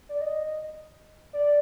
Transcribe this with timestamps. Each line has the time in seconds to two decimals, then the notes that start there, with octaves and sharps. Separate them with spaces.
0.09 D5
0.21 D#5
1.33 D5